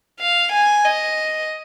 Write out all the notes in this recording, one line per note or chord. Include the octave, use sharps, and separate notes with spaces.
F5
G#5
D#5